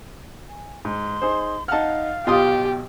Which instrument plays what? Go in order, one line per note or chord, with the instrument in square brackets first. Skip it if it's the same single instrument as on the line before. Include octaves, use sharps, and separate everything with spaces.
[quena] G#5
[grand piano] G#2 [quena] C6
[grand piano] D#4 G#4 C5
[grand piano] D#4 F#5 [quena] F5 [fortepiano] A5 F6
[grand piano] B1 B2 [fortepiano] F4 C6 D#6 [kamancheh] G4